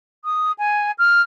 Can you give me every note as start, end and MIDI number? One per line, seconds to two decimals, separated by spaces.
0.25 0.52 87
0.58 0.91 80
0.98 1.22 89